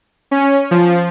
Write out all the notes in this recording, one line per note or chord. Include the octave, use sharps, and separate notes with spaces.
C#4
F3